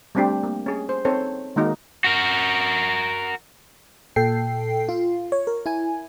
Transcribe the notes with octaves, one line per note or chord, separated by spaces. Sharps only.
G3 A3 C4 D4 G4
A#3
C#4 G#4
C5
C4 D#4 A4 C5 C#5
D#3 G#3 A#3 D#4 F#4
F#4 A#4
A#2 A4 G5 C7
F4
C#5
A#4
E4 G#5